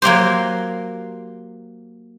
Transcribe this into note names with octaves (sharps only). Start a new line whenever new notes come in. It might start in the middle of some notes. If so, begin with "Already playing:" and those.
F#3 A#3 G4 C5